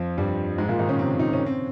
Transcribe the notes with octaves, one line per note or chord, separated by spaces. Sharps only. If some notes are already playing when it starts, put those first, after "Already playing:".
Already playing: F2 F3
G2 G3
G#2 G#3
A#2 A#3
D#3 D#4
C#3 C#4
C3 C4
D#4
C#4
C4